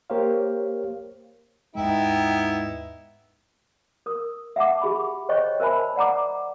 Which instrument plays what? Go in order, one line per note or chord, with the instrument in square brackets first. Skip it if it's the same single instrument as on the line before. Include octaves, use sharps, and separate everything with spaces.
[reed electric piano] A#3 G4 A#4 C5 C#5 F5
[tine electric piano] D#2 G#2 G#3 [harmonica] B3 E4 [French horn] D#4 [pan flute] G5
[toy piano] A#4 D#6
E5 F#5 A5 D6
G4 G#4 E5 B5
C5 C#5 D#5 G5 C#6
A#4 C5 E5 G#5 A5 B5
D5 F#5 A#5 D6